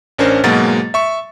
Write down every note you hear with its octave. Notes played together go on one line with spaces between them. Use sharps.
A1 C#4 D4 A#4 C5
G#2 B2 F#3 G#3 A#3 A6
E5 C#6